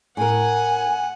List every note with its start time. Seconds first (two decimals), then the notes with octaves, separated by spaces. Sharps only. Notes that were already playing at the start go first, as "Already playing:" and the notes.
0.17 A2 A#4 F#5 G#5